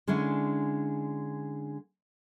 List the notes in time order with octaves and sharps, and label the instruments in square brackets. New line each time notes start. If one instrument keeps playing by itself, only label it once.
[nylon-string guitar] D3 G#3 C#4 D4 E4